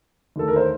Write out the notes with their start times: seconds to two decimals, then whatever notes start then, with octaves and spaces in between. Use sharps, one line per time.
0.36 D#2 D3 A3 A4
0.48 A#4
0.56 C5